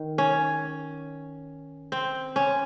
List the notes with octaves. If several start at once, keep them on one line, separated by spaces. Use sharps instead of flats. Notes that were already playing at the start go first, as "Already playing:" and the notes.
Already playing: D#3
C#4
C4
C#4